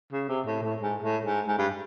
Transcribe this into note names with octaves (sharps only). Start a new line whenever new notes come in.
C#3
C3
A2
A2
G#2
A2
G#2
G#2
G2